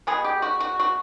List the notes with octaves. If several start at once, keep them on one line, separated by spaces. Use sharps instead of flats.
B2 G#3 B3 G#4
G4
F#4
F#4
F#4